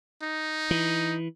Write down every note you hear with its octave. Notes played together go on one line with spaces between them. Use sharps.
D#4
E3